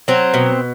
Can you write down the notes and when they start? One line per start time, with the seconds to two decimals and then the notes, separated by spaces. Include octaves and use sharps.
0.08 F#3 C4
0.34 B2